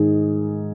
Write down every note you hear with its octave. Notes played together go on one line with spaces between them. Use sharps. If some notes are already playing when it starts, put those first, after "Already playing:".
Already playing: G#2 D#3 G#4